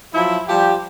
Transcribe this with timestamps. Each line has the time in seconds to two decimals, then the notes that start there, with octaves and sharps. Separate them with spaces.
0.14 F3 F#3 E4
0.48 F3 G3 G4